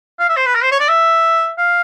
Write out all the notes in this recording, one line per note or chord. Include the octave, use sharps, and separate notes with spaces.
F5
E5
C5
B4
A#4
C5
C#5
D5
E5
F5